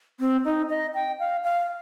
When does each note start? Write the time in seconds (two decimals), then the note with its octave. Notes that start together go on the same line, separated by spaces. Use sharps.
0.20 C4
0.45 D#4
0.69 D#5
0.95 G5
1.19 F5
1.44 F5